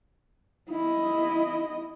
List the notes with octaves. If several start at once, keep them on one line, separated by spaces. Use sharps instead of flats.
E4 D#5